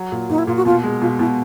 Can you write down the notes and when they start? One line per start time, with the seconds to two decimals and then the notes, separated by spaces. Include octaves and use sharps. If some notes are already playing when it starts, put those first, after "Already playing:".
Already playing: F#3
0.12 A#2
0.29 A#2 D#4
0.38 E4
0.47 A#2 F4
0.57 F#4
0.65 B2 F4
0.83 G#3
1.01 B2 F4
1.19 B2 E4